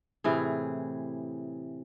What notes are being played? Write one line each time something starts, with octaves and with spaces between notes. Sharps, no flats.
A2 C3 E3 G#4